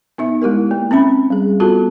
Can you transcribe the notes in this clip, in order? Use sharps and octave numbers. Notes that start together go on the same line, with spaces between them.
B3 D#4 E5
G#3 E4 G4 A#4
A#3
C4 C#4 E5 B5
G3 G#4
B3 F4 F#4 A4 A5